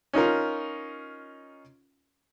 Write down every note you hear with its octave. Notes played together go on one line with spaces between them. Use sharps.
C#4 D#4 F4 A#4